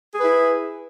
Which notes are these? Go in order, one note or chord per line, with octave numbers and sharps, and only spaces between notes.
E4 G#4 B4